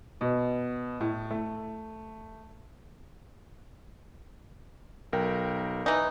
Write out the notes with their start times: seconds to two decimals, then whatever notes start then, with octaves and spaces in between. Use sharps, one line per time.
0.21 B2
1.00 A2
1.31 A3
5.13 B1 A#4 G5
5.86 E3 D#4